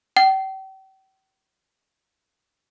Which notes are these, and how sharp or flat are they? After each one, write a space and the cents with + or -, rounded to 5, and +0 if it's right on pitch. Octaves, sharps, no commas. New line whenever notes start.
G5 -40